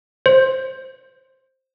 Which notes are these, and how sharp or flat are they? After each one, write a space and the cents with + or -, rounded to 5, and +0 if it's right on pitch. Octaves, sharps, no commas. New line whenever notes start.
C5 +10